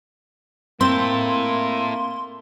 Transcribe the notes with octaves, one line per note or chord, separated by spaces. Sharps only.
A#3 C4 E4 A4 C6